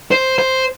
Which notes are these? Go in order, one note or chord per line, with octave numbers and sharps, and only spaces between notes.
C5
C5